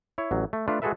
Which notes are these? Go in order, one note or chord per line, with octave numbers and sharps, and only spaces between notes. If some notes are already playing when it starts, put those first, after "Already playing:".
E4 C#5
A1 F#3
A3
A3 D4 F4 B4
G#3 F#4 G#4 A4 B4 E5